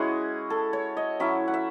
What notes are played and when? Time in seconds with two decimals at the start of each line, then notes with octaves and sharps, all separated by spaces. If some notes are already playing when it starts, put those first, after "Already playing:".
Already playing: G#3 C#4 E4 F#4 G#4
0.50 A4
0.73 C#5
0.97 D#5
1.20 F#3 C#4 E4 E5
1.48 F#5
1.54 E5